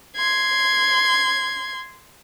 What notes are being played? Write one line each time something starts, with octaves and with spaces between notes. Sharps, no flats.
C6 G#6